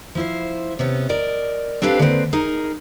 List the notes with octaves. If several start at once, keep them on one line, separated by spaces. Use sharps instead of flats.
F3 E4 C5
C3 B3 C#4
A#4 D5 D#5
C4 D4 G4 A4 B4 F5
D3 G#3 A#3 C4 B4
D#4 G#4 A#4